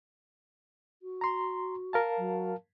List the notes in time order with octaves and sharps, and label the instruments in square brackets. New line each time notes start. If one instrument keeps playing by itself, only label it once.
[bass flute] F#4
[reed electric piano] A#5 C6
A#4 F5 A5
[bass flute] F#3